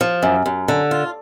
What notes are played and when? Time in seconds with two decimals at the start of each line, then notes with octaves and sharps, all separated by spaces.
0.01 F3
0.23 F#2
0.46 F#2
0.68 D3
0.91 F4